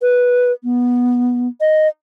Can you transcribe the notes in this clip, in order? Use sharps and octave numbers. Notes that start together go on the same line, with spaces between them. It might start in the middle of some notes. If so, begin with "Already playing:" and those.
B4
B3
D#5